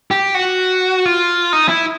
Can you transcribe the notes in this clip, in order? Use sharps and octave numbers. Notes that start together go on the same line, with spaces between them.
G4
F#4
F4
D#4
E4